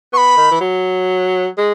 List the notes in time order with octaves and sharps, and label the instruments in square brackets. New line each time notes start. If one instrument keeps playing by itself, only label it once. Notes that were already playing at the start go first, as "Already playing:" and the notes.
[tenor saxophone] B3 [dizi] C#6
[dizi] B5
[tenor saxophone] D#3
E3
F#3
G#3